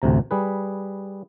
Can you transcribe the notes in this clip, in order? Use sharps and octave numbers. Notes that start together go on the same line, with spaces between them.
A1 D2 C3 A#5
G3 G#4 B4